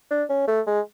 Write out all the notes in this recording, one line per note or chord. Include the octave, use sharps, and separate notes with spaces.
D4
C#4
A3
G#3